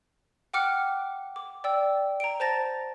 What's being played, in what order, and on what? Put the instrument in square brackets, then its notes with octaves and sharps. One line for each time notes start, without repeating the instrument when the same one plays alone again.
[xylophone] F#5 G5 D6 F6 F#6 C#7
D6
D5 G5 E6
A#5 D7
C5 A5 A#5 A6 A#6